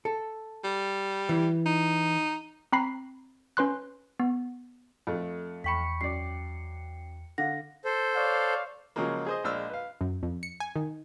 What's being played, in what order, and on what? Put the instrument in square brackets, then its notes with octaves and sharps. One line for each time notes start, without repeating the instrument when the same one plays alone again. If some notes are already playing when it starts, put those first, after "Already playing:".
[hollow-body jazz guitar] A4
[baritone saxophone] G3
[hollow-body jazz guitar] E3
[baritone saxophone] D#4
[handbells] C4 A#5 B5 C7
C#4 B4 C6 F#6
B3
[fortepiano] F2 A3
[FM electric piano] E2 G5 C#7 [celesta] B5 C#6 B6
[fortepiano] F#2 D5 [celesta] C7
[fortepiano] D3 [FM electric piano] F5 F#5 [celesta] A#6
[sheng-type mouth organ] A4 C5
[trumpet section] C#5 D5 F5
[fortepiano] C#3 F3 F#3 G#3 A#3
G#4 C5 D#5
A#1 G#3 D5 E6 F6
B4 F5
[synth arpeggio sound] F#2
F2
C#7
G#5
D#3